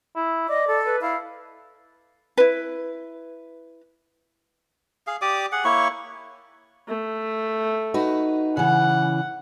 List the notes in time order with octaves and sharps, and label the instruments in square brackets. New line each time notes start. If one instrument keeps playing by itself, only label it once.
[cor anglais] E4
[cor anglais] D5 [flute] D#5
[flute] A4
[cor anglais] B4
[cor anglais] E4 [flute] F5
[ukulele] E4 B4
[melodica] G#4 F5
G4 D5 D6 D#6
G#4 F#5
A#3 E4 C#5 C#6
[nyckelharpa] A3
[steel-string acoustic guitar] D#4 F#4 B4
[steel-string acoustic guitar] C#3 E3 [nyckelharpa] F#5